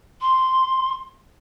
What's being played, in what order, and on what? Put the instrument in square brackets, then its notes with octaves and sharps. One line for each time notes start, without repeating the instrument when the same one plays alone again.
[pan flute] C6